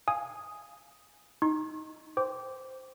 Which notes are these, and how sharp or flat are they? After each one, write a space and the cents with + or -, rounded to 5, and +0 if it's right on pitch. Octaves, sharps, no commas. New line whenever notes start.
F5 +0 G#5 +0 D#6 +0
D#4 +0 C6 +45
C5 -5 G5 +0 D6 -15